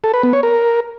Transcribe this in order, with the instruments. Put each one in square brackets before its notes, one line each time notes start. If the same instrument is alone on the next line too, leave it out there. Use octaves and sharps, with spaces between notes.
[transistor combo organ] A4
B4
B3
C#5
A#4